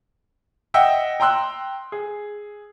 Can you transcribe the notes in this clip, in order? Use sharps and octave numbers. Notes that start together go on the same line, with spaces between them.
D#5 E5 F#5 G5 E6
G5 A#5 C6 E6 F#6
G#4